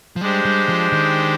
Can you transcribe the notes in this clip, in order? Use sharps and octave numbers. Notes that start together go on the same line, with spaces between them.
F3
G3 G#3 D4 G4 C5
G3
F3
D#3